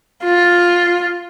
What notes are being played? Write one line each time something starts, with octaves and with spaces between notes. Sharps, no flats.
F4